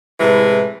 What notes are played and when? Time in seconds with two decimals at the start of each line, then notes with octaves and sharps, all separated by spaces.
0.20 A2 C3 E3 G#3